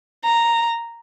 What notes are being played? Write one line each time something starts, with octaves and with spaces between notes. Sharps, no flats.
A#5